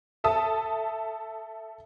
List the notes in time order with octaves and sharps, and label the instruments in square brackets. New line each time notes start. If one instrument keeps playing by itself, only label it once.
[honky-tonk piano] A4 E5 A5 D#6